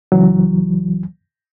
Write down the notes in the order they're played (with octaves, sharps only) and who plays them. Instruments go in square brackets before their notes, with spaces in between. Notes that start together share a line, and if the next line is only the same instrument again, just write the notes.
[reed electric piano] C#2 E3 F#3